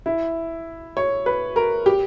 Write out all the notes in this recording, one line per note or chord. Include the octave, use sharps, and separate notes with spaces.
E4
C#5
B4
A#4
G4